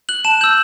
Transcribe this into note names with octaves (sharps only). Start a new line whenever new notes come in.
F#6 F#7
A5 E7
E6 G6 F#7